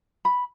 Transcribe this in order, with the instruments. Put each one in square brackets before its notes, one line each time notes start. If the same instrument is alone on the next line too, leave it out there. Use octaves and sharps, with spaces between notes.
[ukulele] B5